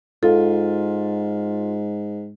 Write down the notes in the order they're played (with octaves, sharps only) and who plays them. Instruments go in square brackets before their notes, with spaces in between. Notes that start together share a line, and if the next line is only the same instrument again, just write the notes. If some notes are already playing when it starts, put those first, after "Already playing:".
[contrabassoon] G#2 [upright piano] F4 [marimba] A4